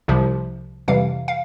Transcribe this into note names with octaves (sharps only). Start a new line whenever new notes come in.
C2 C3 F3
F2 C3 E3 G3 F5
F5